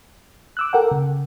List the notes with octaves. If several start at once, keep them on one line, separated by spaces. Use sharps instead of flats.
D6 E6 F#6
A4 A#4 F#5 G5
C#3